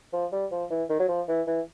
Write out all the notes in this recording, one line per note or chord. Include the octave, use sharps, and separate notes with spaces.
F3
G3
F3
E3
D#3
F#3
F3
E3
E3